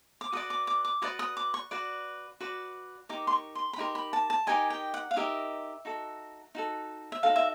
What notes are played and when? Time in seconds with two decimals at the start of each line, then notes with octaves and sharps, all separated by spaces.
0.21 D6
0.32 F#4 B4 D5 D#6
0.50 D6
0.67 D6
0.85 D6
1.02 F#4 B4 D5 D#6
1.19 D#6
1.37 D6
1.54 C#6
1.71 F#4 B4 D5
2.40 F#4 B4 D5
3.09 D#4 G4 A#4 D6
3.27 C6
3.32 C#6
3.55 C6
3.73 B5
3.78 D#4 G4 A#4 C6
3.95 B5
4.13 A5
4.30 A5
4.47 D#4 G4 A#4 D#5 G#5
4.70 G5
4.94 F#5
5.11 F5
5.16 D#4 G4 A#4 D#5 E5
5.85 D#4 F#4 A4
6.55 D#4 F#4 A4
7.12 E5
7.23 D#4 F#4 A4 F5
7.36 E5